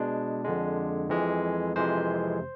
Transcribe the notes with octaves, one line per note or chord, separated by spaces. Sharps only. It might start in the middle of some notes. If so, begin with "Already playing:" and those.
Already playing: B2 G#3 D4
F2 D3 G#3
F2 E3 G#3
F2 C3 E3 G#3 C5